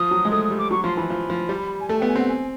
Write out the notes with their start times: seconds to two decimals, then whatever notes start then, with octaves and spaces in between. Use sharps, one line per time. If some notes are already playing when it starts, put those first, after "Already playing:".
Already playing: F3 D#6
0.11 F#3
0.25 G#3
0.31 A3 D#6
0.44 D#6
0.51 G3
0.58 D6
0.71 F#3 C#6
0.84 F3 C6
0.97 E3 B5
1.10 F3
1.30 F3
1.49 G3
1.80 G#5
1.89 A3 A5
1.99 B3 G5
2.08 G#5
2.16 C4 F#5
2.29 G#5